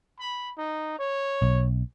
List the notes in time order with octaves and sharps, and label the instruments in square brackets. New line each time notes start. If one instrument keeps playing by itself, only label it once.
[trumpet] B5
D#4
C#5
[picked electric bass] B1